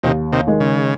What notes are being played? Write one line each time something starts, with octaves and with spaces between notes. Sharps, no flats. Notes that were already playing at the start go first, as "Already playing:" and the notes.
D#2 C3 D#3
C3 D#3
D#3 G#3
C#3